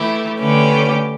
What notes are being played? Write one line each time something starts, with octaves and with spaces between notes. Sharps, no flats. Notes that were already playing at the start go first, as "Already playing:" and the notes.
Already playing: E3 A3 E4 G4
D3 A3 C#4 G4 B4